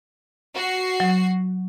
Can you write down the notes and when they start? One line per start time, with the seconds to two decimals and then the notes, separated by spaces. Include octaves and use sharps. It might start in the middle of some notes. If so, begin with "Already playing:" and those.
0.55 F#4 C7
1.00 F#3